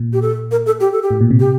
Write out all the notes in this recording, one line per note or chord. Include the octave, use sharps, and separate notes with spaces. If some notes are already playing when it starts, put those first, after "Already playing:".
Already playing: A#2
G4
A4
A#4
A4
G4
A4
G4
A2
A#2
C3
G4